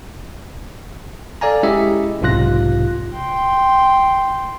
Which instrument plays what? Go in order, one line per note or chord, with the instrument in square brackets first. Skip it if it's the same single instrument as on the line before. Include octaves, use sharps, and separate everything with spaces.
[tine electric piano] A4 D5 F5 G#5 A#5
G#3 C#4 E4 G4 D#5 E5
B1 G#2 C3 F4 F#6 A#6
[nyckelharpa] G5 C6